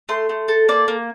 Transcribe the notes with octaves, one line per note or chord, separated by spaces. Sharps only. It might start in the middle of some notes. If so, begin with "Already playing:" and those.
A3 C6
A3
A4
A#3 D5
A#3